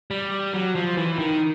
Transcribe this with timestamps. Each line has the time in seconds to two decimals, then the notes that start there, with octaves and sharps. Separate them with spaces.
0.11 G3
0.53 F#3
0.75 F3
0.97 E3
1.19 D#3